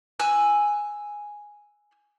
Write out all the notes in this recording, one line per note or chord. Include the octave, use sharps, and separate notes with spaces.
G#5 E6 F#6